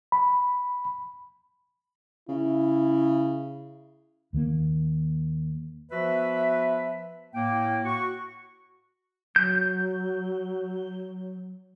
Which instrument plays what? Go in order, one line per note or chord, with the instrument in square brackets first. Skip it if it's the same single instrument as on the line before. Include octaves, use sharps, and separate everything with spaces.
[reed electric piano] B5
[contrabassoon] C#3 [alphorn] E4
[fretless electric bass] D#2 D#3 F#3 A#3
[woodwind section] F3 B3 F#4 B4 E5
A2 A#3 G5
F#4 C#6
[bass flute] F#3 [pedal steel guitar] G6